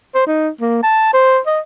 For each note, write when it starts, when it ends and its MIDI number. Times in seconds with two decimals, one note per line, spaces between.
0.15 0.26 72
0.27 0.49 63
0.61 0.81 58
0.83 1.11 81
1.14 1.39 72
1.46 1.60 75